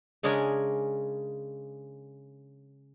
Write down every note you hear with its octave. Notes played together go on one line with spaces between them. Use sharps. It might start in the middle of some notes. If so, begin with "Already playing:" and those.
C#3 G#3 C#4 D4 A#4 G#5